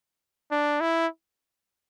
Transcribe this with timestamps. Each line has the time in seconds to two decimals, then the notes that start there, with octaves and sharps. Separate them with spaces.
0.52 D4
0.81 E4